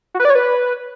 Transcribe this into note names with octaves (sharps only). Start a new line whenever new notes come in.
F#4
B4
D5
C#5
B4